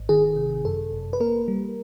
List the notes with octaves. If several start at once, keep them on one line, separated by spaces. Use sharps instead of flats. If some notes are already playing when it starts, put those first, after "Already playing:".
Already playing: G#1
D#3 G#4
C3
F#2 A4
G1
B4
A#3 A#4
G3